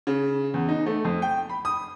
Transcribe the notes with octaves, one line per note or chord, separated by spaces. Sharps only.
C#3
E2
D#4
A3
F2
G5
B5
D#6